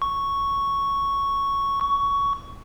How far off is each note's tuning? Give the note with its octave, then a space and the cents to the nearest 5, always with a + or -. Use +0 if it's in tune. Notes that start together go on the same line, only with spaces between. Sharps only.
C#6 +0
C#6 +15